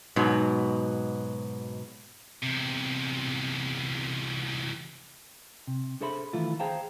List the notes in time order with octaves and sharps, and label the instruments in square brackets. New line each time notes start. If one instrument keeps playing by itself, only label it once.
[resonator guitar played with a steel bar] G#2 B2 F#3
[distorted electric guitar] E2 C3
[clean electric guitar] C3
D4 G#4 A4 C5 E5 B5
D#3 E3 A3 E4 F4
G#4 C5 F5 G5 A5 A#5